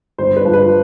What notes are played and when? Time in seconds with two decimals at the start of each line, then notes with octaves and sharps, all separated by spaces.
0.18 G1 C5
0.36 B4
0.45 G2 F3
0.53 B4